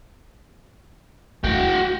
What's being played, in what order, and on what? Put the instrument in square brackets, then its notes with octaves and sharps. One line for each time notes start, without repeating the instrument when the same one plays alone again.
[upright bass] A3 A#3 [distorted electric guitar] F#4 G5